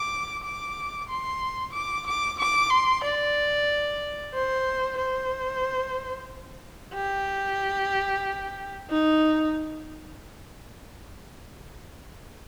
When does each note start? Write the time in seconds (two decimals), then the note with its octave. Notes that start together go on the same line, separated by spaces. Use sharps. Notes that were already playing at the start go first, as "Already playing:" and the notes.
Already playing: D6
0.43 D6
1.09 C6
1.73 D6
2.06 D6
2.39 D6
2.70 C6
3.04 D5
4.34 C5
4.98 C5
6.94 G4
8.89 D#4